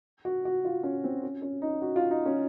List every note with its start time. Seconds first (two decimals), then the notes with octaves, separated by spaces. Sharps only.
0.25 F#4
0.45 F#4
0.65 F4
0.83 C#4
1.04 C4
1.24 C#4
1.42 C#4
1.62 D#4
1.82 F#4
1.96 F4
2.11 D#4
2.25 C#4